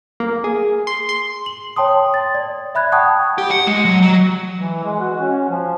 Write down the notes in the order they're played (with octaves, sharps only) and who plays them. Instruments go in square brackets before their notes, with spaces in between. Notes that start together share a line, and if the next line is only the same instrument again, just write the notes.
[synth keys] A#3
G#4
C6
C6
[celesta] F#7
C#5 G5 A5 C6 D#6
A6
D5
E5 B5 F#6 G#6
F#5 G5 A5 C#6 D#6 G#6
[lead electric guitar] G4
F#5
G#3
F#3
F#3
[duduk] E3
G#3
F#4
C#4
F3